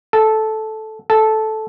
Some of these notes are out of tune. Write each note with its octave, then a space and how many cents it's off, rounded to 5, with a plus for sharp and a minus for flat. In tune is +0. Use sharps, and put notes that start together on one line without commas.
A4 -10
A4 -10